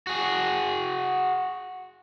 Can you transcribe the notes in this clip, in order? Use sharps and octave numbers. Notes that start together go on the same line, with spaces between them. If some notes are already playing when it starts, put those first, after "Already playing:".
F#4 G#4